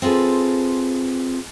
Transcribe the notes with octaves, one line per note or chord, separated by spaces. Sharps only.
C4 F4 G#4 A4 B4